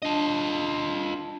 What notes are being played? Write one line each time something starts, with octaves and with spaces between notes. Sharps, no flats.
D4 F4 D#5 A5